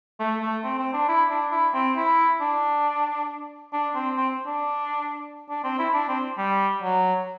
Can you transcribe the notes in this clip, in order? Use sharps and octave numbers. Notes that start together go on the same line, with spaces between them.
A3
A3
C4
C4
D4
E4
D4
E4
C4
E4
D4
D4
C4
C4
D4
D4
C4
E4
D4
C4
G3
F#3